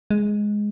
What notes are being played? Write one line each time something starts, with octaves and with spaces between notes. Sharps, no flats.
G#3